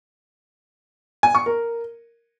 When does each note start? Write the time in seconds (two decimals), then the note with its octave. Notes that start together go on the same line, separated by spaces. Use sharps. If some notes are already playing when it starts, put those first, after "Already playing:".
1.23 G#5
1.35 C#6
1.46 A#4